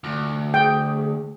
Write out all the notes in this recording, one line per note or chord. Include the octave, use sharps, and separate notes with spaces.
D2
G#4 G5